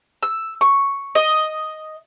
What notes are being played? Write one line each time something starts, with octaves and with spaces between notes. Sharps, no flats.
E6
C#6
D#5